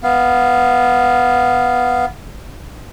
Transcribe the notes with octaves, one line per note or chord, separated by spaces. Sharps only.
B3 F5